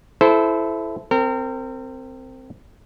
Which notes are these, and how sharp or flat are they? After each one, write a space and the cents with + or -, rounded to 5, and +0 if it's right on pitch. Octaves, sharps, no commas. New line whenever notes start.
E4 +10 A4 -20 C5 -15
C4 -5 A#4 -35